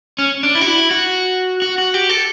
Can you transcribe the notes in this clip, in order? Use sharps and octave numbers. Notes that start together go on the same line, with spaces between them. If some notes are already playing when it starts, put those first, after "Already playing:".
C#4
D4
E4
F#4
E4
F#4
F#4
F#4
G4
A4